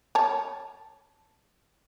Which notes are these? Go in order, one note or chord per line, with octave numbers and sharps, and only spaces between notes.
C#5 A5